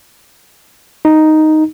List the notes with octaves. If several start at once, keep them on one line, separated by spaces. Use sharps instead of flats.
D#4